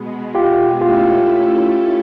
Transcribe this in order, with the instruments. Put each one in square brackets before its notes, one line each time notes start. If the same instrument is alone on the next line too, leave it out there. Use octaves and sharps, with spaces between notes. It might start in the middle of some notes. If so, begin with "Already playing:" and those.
Already playing: [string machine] B2 G#3 B3
[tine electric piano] F4 G4
[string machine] A3 C#4 E4 A4 [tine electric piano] F4 G4